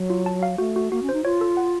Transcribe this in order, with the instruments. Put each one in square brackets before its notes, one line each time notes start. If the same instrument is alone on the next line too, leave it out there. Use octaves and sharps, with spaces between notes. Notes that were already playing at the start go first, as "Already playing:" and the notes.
Already playing: [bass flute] F#3
[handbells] F4
A5
F5
[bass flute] A3 [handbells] F#4
[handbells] F#4
[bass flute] A#3 [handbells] F#4
[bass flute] C#4
[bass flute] D#4 [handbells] C5
[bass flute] F4 [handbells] C#5
[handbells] A4
F#5